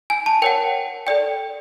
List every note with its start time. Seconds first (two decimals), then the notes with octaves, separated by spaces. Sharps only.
0.10 G#5
0.26 A5
0.42 A#4 C#5 F#5 G5
1.07 A4 D5 G5